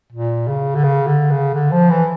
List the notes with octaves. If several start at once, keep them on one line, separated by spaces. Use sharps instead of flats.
A#2
C#3
D3
C#3
D3
C#3
D3
F3
E3